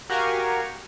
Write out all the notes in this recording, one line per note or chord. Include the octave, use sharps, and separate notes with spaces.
F#4 G4 A#4 F5 G#5 C#6